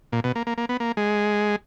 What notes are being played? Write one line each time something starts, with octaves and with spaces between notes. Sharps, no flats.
A#2
B2
A#3
A#3
A#3
B3
A#3
G#3